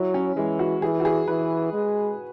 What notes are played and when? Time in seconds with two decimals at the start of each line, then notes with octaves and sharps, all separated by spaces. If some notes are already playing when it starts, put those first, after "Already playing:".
Already playing: F#3 E4
0.14 C#4
0.36 E3 G#3
0.59 F#4
0.82 E3 G#4
1.00 F#4
1.05 G#4
1.28 E3 B4
1.73 G#3